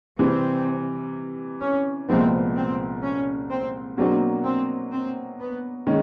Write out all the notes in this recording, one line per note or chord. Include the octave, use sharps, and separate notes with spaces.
C3 E3 G3 C4
C#4
C2 A#2 F3 G#3 B3 C4
C4
C#4
C4
B2 F#3 A#3 C4 D4 F#4
C4
C4
B3
D#3 G#3 C#4